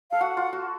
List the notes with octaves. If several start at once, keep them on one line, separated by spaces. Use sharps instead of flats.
A4 F5
F#4 F#5
F4
F#4